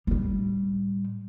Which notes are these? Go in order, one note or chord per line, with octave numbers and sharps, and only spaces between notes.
A2 G3